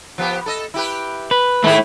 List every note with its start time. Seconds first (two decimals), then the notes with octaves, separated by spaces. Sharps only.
0.18 F3 B3 G4
0.46 A4 D#5
0.74 E4 G4 B4
1.31 B4
1.64 D#3 A3 E4 G4 G#4